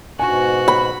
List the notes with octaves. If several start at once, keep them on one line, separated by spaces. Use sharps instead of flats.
G#2 B2 F#4 G#5
B5